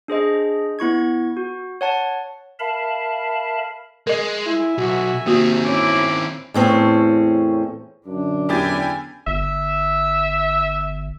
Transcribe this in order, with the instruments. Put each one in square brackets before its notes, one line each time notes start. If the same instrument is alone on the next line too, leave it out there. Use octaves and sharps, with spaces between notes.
[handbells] D4 G#4 C5 D#5
B3 E4 C#6 G#6
F#4
C#5 F#5 A5
[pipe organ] A#4 E5 F5 A5 B5
[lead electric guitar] G#3 [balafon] A#4 D#5
[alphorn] E4 [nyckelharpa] E5 G#5
[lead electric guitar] B1 [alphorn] F#4
[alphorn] C3 [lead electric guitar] D#3 C4 [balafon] A#3 F#4
[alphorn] C#4 [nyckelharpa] E4 D6
[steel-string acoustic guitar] E2 A2 C4 C#4
[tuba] F#2 [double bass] D3 D4
[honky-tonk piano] E2 G4 A6 [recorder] G#5
[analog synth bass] G1 [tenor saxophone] E5